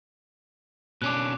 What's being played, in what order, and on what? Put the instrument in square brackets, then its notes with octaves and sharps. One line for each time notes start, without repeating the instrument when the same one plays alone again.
[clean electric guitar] B2 C#4 D4 [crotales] D6 F#6